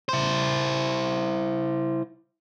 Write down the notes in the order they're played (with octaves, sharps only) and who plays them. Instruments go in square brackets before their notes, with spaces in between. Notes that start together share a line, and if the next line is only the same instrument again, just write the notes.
[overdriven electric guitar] E4 C5